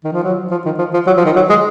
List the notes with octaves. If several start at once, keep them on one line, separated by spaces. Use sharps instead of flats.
D#3
F3
F#3
F3
D#3
F3
F3
F#3
F3
D#3
F#3
G#3